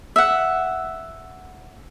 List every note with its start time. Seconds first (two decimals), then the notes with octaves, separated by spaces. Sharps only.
0.16 E5 F#5